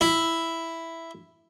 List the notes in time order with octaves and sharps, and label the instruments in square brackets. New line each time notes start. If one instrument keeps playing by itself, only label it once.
[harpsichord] E4